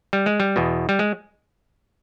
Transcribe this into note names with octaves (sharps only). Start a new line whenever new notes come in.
G3
G#3
G3
E2 B2
G3
G#3